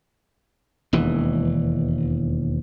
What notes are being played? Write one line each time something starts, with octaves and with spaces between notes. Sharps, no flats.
E1 D#2 E3